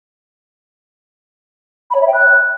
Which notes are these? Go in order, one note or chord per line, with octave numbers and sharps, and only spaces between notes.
B5
C#5
E5
G5
F#6